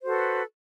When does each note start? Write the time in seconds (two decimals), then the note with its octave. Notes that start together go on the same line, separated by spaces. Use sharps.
0.01 C5
0.03 F#4
0.06 A4
0.08 B4